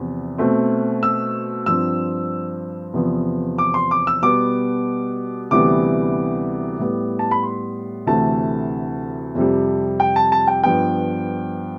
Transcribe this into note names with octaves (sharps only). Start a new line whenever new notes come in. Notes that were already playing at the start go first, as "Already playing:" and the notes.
Already playing: E2 C3 F3 B3
B2 A3 C4
E6
G2 F3 C4 E6
E2 C3 F3 B3
D6
C6
D6
E6
B2 G3 B3 D6
D2 C3 E3 G3 B3 D6
A2 G3 B3
A5
B5
C6
D2 C3 E3 A3 A5
F2 C3 G3
G5
A5
A5
G5
G2 F3 B3 G5